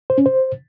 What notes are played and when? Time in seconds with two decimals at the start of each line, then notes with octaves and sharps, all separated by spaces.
0.10 C5
0.18 C#4
0.26 C5